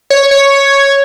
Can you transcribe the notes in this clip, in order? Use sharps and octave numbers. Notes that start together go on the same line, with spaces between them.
C#5
C#5